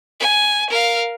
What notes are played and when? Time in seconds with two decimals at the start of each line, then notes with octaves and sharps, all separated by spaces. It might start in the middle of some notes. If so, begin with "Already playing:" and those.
0.20 G#5
0.70 A#4 F5